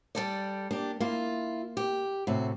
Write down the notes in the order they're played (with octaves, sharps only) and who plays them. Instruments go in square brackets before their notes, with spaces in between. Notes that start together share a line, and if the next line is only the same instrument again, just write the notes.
[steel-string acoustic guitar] G3 A4 D5
[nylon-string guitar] A#3 [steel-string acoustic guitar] D4 G4
[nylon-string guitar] A#3 [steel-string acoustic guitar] E4 F4
[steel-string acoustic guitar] G4
[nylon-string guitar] A2 C3 [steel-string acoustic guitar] F#4